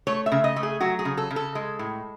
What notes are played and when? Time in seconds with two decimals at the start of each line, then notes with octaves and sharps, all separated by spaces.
0.07 A3 C#5
0.26 E5
0.32 C#3
0.44 D#5
0.56 A3
0.63 G#4
0.81 F#3 F#4
0.99 G#4
1.05 C#3
1.17 A4
1.31 C#3
1.36 A4
1.55 G#3
1.79 A2